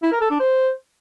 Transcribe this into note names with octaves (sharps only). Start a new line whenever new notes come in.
E4
A#4
A4
D4
C5